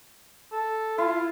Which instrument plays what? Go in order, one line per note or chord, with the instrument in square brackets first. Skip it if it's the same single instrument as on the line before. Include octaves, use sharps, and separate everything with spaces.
[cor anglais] A4
[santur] E4 [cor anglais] F4